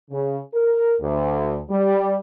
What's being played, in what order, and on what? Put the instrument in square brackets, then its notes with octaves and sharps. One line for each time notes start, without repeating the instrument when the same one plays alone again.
[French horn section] C#3
A#4
D2
G3